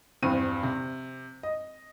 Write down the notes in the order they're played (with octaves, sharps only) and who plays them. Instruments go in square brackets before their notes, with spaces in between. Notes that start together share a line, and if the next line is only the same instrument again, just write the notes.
[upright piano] E2 G2 D#7 [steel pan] C4
[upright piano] C3
D#5